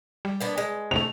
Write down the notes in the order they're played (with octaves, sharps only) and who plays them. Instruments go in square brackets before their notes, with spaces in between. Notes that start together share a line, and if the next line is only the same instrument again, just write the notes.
[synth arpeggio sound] G3
[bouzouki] A#3 B3 D4
G#3
[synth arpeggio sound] C3 A3 [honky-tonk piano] F7